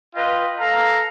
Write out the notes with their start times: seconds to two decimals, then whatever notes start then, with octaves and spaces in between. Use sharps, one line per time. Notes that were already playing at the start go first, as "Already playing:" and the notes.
0.16 F4 B4 D#5 G5
0.59 A4 F5 A#5